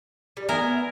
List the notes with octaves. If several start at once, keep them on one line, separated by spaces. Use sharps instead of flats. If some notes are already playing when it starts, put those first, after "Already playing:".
G3
B3 A#4 E5 G#5